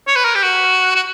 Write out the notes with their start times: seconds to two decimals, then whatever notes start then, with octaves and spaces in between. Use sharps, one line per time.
0.07 C#5
0.16 B4
0.25 A#4
0.35 G4
0.43 F#4
0.95 F#4